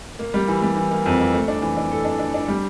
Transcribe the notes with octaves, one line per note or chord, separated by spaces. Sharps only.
A#3
G3
E3
G3
E3
A#3
F2
A#3
A3
D4
E3
D4
A4
D4
D4
D4
G3